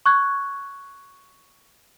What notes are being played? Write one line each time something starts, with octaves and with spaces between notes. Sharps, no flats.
C#6 F#6 G#6